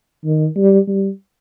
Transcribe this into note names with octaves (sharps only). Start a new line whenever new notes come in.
D#3
G3
G3